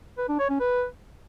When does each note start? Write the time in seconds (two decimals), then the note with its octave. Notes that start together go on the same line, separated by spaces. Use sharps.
0.18 B4
0.29 D4
0.39 C#5
0.50 C#4
0.60 B4